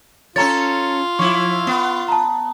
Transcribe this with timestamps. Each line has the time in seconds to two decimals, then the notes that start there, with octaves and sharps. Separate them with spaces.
0.36 C#4 F4 A4 C#5 A#5 A6
1.19 F3 E4 C#6
1.67 B3
2.08 A5 A#5